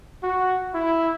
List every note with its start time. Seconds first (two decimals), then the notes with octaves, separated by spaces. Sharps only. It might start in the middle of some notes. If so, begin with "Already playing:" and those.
0.23 F#4
0.74 E4